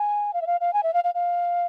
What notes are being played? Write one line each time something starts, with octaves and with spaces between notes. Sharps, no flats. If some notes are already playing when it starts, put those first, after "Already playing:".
Already playing: G#5
F5
E5
F5
F5
G#5
E5
F5
F5
F5